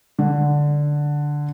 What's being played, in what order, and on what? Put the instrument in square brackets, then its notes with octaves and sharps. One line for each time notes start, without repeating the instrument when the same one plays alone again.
[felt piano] D3